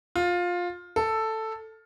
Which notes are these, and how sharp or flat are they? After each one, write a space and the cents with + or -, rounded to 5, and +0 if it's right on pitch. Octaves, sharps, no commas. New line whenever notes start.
F4 +15
A4 +5